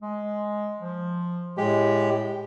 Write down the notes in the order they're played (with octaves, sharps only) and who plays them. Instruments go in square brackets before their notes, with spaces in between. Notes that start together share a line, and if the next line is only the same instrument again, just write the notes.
[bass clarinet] G#3
F3
[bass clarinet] A2 [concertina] G#3 G4